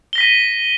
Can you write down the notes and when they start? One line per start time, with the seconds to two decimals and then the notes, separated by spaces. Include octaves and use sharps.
0.13 G7
0.15 A#6
0.18 B6
0.21 D#7